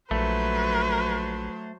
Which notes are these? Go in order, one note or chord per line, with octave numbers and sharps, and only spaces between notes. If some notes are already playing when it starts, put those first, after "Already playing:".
A#1 F#3 A3 B4 C5